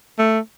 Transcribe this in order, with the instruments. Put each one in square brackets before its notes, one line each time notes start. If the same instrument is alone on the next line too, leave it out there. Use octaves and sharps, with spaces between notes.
[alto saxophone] A3